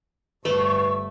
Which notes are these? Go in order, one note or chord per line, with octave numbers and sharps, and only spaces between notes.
G1 A3 B4 C#6